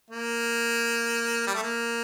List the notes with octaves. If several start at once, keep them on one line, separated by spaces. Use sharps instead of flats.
A#3
G3
A3
A#3